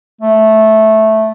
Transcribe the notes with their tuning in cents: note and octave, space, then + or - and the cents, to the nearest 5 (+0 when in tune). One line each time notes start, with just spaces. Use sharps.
A3 -10